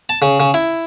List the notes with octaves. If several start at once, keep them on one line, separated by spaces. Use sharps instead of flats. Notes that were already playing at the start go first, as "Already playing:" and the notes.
A5
C#3
C#3
E4